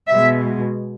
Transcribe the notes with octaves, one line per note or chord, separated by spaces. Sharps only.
B2 G#3 E5